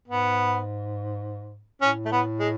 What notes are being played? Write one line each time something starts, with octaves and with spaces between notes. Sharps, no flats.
G#2 B3
A2 C#4
A3
B3
G#3